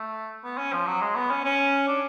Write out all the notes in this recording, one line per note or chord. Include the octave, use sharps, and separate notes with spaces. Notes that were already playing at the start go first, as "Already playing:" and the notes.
Already playing: A3
B3
C#4
F3
F#3
G#3
B3
C#4
C#4
D4